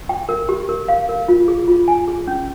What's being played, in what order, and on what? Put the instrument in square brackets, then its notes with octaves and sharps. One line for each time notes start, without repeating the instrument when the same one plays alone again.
[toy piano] G5
A#4
G4
A#4
F5
A#4
F4
G#4
F4
G#5
G#4
C#4